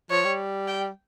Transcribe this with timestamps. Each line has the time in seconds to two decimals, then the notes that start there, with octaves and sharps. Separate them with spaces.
0.10 F3 C#5
0.25 G3
0.68 G5